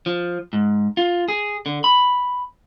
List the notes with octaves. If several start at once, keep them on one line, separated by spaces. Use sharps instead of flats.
F3
G#2
F4
G#4
D3
B5